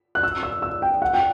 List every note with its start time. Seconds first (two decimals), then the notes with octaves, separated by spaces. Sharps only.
0.15 F#6
0.23 E6
0.43 E6
0.62 E6
0.82 G5
1.02 F#5
1.13 G5